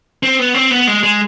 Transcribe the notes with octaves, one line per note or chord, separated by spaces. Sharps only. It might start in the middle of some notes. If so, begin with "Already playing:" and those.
C4
B3
C4
B3
G#3
G#3